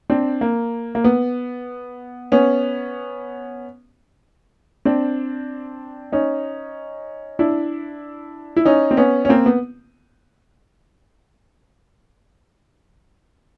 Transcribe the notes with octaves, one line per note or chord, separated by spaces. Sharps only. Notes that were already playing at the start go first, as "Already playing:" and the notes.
C4 D4
A#3
A#3
B3
B3 C#4
C4 D4
C#4 D#4
D4 E4
E4
C#4 D#4
C4
B3 C#4
C#4
A#3 C4
B3